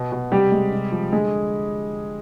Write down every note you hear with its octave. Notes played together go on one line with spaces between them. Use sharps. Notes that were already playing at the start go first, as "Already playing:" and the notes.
Already playing: B2
B2
C3 G3 G4
G#3
C3
F3
D3 G#3 G#4